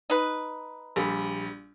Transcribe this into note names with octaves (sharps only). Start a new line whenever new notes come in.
D#4 B4
A#1 G3